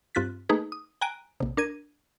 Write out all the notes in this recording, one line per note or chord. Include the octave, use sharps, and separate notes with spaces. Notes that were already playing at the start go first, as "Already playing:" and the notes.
G2 C4 F4 F#6 A6 B6
A3 A#3 D#4 G#4 B4
D#6
G5 G#5 A#5 F#6 D7 D#7
A#1 C3
D4 A#4 G#6 D#7